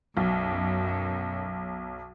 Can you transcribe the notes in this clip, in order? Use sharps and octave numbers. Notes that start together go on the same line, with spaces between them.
B1 F#2